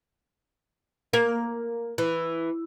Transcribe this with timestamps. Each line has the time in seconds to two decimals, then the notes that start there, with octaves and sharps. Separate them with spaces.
1.13 A#3
1.98 E3